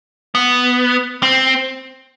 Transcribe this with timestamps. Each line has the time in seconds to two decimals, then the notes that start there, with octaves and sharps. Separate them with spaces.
0.35 B3
1.23 C4